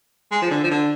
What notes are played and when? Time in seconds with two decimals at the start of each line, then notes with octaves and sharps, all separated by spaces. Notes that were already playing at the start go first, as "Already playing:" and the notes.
0.32 G#3
0.42 F3
0.51 D3
0.63 F3
0.71 D3